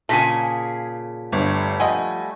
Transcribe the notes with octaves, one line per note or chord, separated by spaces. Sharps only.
A#2 C#3 G#4 G#5 A5 A#6 B6
G1 G3 A3
F3 D#5 F#5 G#5